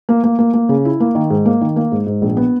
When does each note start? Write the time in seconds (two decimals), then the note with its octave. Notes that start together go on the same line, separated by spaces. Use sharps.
0.09 A#3
0.24 A#3
0.39 A#3
0.54 A#3
0.69 C#3
0.85 E4
1.00 A#3
1.15 D#3
1.30 G#2
1.46 A#3
1.61 D#3
1.76 A#3
1.92 G#2
2.06 G#2
2.22 A#1
2.37 B3